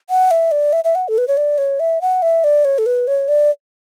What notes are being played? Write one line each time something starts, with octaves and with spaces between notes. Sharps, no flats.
F#5
E5
D5
E5
E5
F#5
A4
B4
C#5
D5
C#5
E5
F#5
E5
D5
C#5
A4
B4
C#5
D5